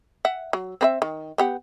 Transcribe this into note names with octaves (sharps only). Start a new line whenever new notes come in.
E5 F#5
F#3
C4 B4 E5
D#3
B3 G4 F#5